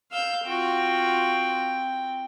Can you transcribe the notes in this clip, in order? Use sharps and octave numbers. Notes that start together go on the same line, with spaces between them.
F5 E6 G6
C4 F4 F#4 G5